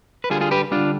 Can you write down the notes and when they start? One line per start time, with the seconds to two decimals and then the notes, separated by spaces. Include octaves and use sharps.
0.24 B4
0.30 D3 G3 F4 G#4
0.41 F4 G#4
0.51 G4 B4
0.71 D3 G3 D4 F4